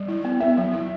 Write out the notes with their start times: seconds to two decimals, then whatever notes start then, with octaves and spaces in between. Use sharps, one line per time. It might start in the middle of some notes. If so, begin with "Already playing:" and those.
Already playing: G3 D5
0.08 E4
0.25 B3
0.40 B3 E5
0.57 F#3
0.73 E4